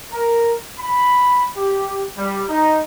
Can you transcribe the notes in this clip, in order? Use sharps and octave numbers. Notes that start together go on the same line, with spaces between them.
A#4
B5
G4
G3
D#4